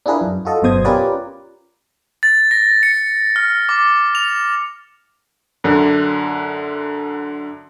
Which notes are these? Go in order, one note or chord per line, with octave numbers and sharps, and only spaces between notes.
D4 E4 F4 G#4 A#4 B4
F#2
F4 F#4 A4 D#5
G1 F#2 B2 C5 D#6 G#6
C#4 F4 G4 A#4 B4 D5
A6
A#6
C#7
F6
D6
F7
F#2 D3